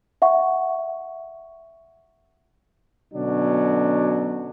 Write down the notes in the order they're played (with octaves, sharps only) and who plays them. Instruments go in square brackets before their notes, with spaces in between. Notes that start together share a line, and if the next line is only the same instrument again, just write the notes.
[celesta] E5 F#5 C#6
[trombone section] B2 D3 F#3 C#4 D4